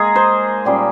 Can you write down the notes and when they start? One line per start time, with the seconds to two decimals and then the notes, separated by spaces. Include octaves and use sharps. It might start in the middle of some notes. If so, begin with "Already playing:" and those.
Already playing: G#3 A#3 D#4 G#4 A#4
0.16 C5
0.65 A#2 G3 C#4